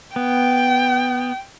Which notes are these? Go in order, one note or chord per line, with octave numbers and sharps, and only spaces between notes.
B3 G5